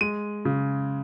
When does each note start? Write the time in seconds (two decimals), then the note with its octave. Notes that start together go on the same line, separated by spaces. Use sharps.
0.01 G#3 D#7
0.45 C#3